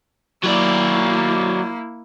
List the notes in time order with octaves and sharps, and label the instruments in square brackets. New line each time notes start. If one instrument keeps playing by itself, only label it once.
[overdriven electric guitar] F#3 D5 [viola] A#3 E4